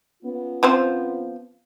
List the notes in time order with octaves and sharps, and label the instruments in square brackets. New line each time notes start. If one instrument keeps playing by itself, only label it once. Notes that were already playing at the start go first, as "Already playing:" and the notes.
[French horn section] B3 C#4 F4
[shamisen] F3 C4 C5